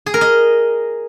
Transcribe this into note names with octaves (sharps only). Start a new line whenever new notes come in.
G#4
A#4
D#5